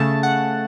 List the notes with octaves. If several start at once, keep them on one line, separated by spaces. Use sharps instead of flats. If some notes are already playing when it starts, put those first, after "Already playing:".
Already playing: C#3 A3 A5
F#5